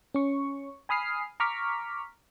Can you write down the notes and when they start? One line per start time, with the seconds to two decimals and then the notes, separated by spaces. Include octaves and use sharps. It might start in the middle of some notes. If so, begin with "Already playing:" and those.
0.14 C#4 C#6
0.89 G#5 B5 D#6 F6 C7
1.40 A#5 C#6 D6 F6 B6